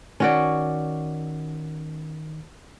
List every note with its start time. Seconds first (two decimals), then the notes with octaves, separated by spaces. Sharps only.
0.20 D#3 C#4 F#4 D5